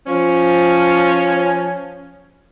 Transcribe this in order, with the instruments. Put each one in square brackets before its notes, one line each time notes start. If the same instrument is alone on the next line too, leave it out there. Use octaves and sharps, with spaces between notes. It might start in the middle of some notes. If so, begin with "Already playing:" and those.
[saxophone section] F3 C#4